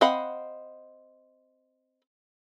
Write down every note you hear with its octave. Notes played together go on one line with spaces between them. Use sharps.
C4 D#5 F5 F#5 B5